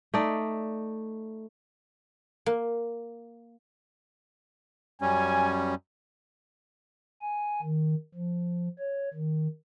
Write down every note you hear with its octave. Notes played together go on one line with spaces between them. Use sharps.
A3 D#4 D5
A#3
F#2 G3 C#4 G#5
G#5
D#3
F3
C#5
D#3